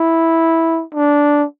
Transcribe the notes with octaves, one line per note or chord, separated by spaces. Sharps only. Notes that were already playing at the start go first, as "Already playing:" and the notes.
Already playing: E4
D4